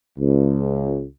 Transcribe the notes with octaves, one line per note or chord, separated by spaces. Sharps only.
C#2